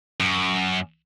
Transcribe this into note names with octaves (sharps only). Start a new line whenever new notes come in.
F#2